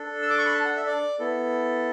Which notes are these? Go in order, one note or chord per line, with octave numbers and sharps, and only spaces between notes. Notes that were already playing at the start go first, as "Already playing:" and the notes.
Already playing: D4 A4
E6
D6
C#6
B5
A5
F#5
E5
D5
B3 E4 A4